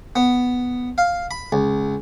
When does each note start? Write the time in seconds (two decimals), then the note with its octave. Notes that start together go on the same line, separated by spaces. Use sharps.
0.16 B3
0.98 F5
1.31 B5
1.52 C#2